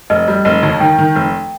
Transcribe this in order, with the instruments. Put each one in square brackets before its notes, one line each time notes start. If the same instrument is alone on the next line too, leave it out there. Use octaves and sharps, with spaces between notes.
[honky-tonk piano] F1 [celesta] D#5
[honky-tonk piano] G3
[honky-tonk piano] F1 [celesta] D#5
[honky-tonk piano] D#2
[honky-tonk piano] D#3 [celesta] G5
[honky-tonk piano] D#3
F1